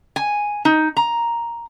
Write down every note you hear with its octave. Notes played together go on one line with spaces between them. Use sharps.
G#5
D#4
A#5